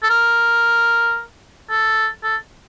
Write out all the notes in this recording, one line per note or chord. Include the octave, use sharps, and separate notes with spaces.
A4
A#4
A4
A4